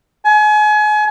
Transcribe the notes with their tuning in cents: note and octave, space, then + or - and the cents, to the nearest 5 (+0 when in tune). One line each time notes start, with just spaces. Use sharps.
G#5 +35